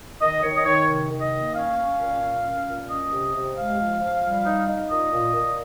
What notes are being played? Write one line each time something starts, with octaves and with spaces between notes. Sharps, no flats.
D#3 D#5
D#3 C#5
D#5
D#3 C#5
C3
D#3
D#5
A#3
C#4 F5
C#4
A#2
C#4
C#4
A#2
C#4 D#5
C3
C3
G#3 F5
F3
F3
G3
D#4
D#4
A#2 D#5
A#2
A#2